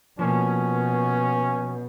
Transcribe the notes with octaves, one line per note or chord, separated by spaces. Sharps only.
B2 F3 A#3 C#4